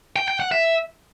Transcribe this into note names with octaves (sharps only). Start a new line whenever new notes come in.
G5
G5
F#5
E5